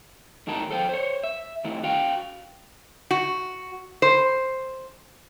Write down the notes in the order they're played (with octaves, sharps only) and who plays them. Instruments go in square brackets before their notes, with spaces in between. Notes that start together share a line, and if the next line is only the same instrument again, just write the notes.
[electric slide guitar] A2 D#3 D#4 F#4 A#4 A5
A4 C5 G5
C5 C#5
E5
D#3 A3 E4
F#4 F5 G5
[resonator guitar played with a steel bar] F#4
C5